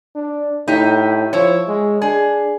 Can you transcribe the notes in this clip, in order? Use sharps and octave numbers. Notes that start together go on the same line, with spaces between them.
D4
A2 D#4 G4
F3 E4 C#5
G#3
D4 G#4